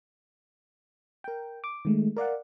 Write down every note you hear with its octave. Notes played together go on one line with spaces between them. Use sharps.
A#4 G5
D6
D#3 G#3 A3
A#4 D5 F5 F#5